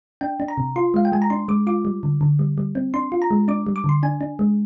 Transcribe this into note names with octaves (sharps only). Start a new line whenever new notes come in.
D4 G5
D4
A#5
C3
F4 C6
G#3 F5
G5
G#3 G#5
A#5
D4 C6
G#3 D6
F4 D6
G3
D3
D3
G3
G3
C4
D4 C6
F4
A#5
G#3
D4 D6
G3
D6
D3 C6
D4 G#5
D4
G#3